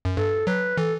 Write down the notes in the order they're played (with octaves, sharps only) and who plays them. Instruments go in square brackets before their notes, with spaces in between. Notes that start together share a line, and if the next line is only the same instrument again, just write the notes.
[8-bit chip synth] F#2
[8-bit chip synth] G2 [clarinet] A4
[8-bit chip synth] F#3 [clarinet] B4
[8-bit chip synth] E3 [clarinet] A4